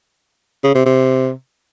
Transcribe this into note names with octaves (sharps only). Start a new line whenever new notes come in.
C#3
C3
C3